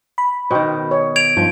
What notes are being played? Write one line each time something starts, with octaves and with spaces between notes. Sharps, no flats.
B5
B2 D#3 C5 G5
C#5
G#6 D7 F7
G2 F3 D#4 C5